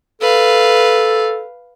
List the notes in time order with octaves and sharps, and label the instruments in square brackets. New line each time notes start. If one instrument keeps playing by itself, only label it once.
[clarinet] A4 [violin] B4 F5